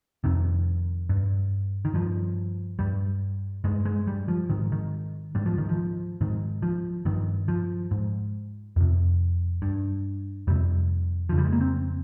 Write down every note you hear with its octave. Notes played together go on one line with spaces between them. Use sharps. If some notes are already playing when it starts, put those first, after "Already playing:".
F2 C3 D#3
G2
D#3
G2 F3
G2 G3
G2 G#3
G#3
G3
F3
G#2 D#3
D#3
G#2 G3
F3
D#3
F3
G#2 D#3
F3
G2 D#3
F3
G#2
F2 C3
G2
F2 C3 G3
F2 C#3 F3
G3
G#3
A#3
C4